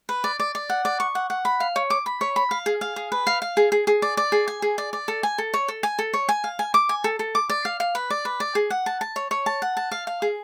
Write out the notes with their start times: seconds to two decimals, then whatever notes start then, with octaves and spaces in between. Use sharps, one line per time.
0.09 B4
0.24 D5
0.40 D5
0.55 D5
0.70 F#5
0.85 D5
1.00 C#6
1.15 F#5
1.30 F#5
1.45 B5
1.60 F5
1.76 C#5
1.90 D6
2.06 B5
2.21 C#5
2.36 B5
2.51 F5
2.66 G#4
2.81 F5
2.96 G#4
3.12 B4
3.27 F5
3.42 F5
3.57 G#4
3.72 G#4
3.87 G#4
4.02 D5
4.17 D5
4.32 G#4
4.48 G#5
4.62 G#4
4.78 D5
4.93 D5
5.08 A4
5.23 G#5
5.38 A4
5.54 C#5
5.68 A4
5.83 G#5
5.99 A4
6.14 C#5
6.29 G#5
6.44 F5
6.59 G#5
6.74 D6
6.89 G#5
7.04 A4
7.19 A4
7.35 D6
7.50 D5
7.65 F5
7.80 F5
7.95 B4
8.10 D5
8.25 B4
8.40 D5
8.55 G#4
8.70 F#5
8.86 A5
9.01 A5
9.16 C#5
9.31 C#5
9.46 A5
9.62 F#5
9.77 A5
9.91 F5
10.07 F5
10.22 G#4